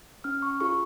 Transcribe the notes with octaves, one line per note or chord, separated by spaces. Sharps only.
C#4 F6
C#6
F4 G#4 C#6